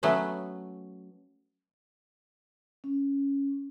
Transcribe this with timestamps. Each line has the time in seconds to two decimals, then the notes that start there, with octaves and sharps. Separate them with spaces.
0.03 F#3 A3 B3 C#4 B4
2.84 C#4